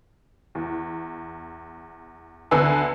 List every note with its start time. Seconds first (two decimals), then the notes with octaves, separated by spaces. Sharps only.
0.55 E2
2.51 D2 D3 B3 B4 G#5 E6